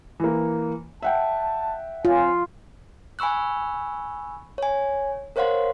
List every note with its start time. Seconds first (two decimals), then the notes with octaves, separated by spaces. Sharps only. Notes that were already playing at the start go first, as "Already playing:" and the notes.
0.20 E3 A#3
1.02 E5 F#5 G5 A5
2.05 C4 F4 C#5 G#5
3.19 G#5 B5 C#6 E6 F#6
4.58 C#5 G#5
5.36 A#4 C5 C#5 F5 F#5 C6